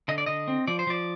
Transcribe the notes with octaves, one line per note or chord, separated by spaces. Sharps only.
D3 D#5
D5
D3 D#5
C4
F3 D5
C5
F3 D5